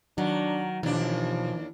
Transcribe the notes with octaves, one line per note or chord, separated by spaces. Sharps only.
D#3 F#3 D4 F#5
D#2 B2 E3 F3 D4